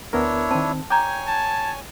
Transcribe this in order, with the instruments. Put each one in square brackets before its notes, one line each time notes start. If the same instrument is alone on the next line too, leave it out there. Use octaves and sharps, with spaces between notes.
[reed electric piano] D2 B3 A#4 [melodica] D4 E4 C#5
[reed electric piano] D#3 C4 [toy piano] A5
[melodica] C#5 G#5 [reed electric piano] G5 G6 G#6 [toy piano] A#5 D6
[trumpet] A5